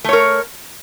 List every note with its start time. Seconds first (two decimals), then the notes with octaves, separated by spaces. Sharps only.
0.04 A3
0.09 C#5
0.13 A#4